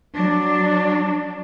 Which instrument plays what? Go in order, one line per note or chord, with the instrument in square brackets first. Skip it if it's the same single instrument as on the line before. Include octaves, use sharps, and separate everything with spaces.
[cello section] F#3 D4